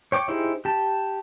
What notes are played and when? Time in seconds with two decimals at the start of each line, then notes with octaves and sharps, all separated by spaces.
0.12 C#5 G5 D6
0.28 D#4 E4 G4 G#4 C5
0.65 G4 A5